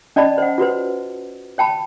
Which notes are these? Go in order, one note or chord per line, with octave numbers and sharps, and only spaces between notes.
C#4 D5 D#5 A5 B5
C5 F#5
F4 F#4 B4 C5
C#5 G5 A5 B5